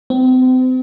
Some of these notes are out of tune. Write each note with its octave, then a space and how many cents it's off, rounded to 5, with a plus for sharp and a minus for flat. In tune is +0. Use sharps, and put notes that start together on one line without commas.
C4 -35